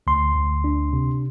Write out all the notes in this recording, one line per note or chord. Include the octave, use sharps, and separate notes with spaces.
D2 C6
D2
D4
C3